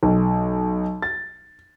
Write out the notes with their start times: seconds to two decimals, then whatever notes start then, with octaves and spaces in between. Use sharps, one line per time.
0.03 B1
1.02 A6